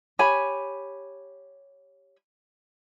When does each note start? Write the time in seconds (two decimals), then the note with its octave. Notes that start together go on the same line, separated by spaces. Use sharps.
0.19 G4 C#5 G#5 B5